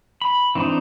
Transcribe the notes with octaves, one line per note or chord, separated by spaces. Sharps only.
B5
E3 C4 D4 D#4